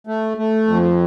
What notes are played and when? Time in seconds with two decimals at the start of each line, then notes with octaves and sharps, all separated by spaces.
0.07 A3
0.37 A3
0.67 F2